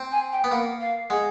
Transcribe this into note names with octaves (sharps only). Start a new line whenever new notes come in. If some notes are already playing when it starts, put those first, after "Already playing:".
Already playing: C4
G#5
G5
B3
A#3 F#5
F5
G#3 F#5